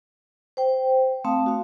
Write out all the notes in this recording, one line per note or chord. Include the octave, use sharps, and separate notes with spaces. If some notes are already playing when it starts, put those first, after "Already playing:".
C5 G5
A3 C4 F5 A5 D#6
F#4 F5